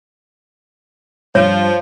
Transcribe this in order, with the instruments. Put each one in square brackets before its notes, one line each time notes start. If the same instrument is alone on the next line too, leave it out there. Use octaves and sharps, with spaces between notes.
[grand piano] G2 [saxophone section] F3 [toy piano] C#5